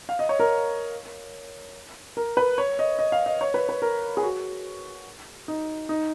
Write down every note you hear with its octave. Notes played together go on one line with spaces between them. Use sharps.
F5
D#5
C#5
A#4
A#4
B4
C#5
D#5
D#5
F5
D#5
C#5
B4
B4
A#4
G#4
F#4
D#4
D#4